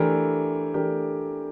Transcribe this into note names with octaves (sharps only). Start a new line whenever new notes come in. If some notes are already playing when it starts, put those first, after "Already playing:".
Already playing: E3 A3 D4 G4 A#4
E3 A3 D4 G4 A#4